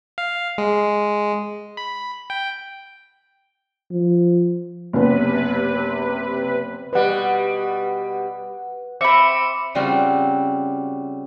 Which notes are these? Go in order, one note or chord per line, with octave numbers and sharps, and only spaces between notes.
F5
G#3
B5
G5
F3
F#1 C3 B3 B4
B2 G3 B4 F#5
C4 E5 B5 D6 C#7
C#3 G3 C4 F4 F#4